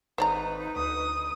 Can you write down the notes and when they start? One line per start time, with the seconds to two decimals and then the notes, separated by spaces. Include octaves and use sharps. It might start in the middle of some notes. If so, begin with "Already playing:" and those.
0.18 G#1 D#4 B4 C5 D5 A#5 C#6
0.76 D2 D#6